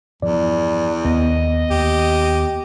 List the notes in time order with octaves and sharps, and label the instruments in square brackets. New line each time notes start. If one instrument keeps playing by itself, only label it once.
[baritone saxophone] E2 [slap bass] G2 F3 [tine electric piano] D5
[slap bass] D#2 [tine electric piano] B3 [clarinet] D#5
[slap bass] D#2 A#3 [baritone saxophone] G4